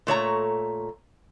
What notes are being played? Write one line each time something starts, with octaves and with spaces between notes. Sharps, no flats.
A#2 A3 C#5 A#5